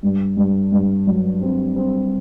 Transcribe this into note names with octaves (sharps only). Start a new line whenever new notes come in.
G2
G2
G2
F#3
C4
C4